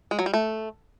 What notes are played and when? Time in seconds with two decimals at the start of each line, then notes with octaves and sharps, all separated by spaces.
0.11 G#3
0.19 F#3
0.26 G3
0.34 A3